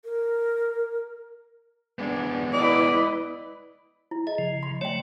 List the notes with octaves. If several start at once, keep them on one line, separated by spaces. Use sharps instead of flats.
A#4
G#3 B3 D4
E4 B4 D5 D#5
E4
G#4 D#5
C#3 F3
C6
F#3 A3 C#5 D5 G5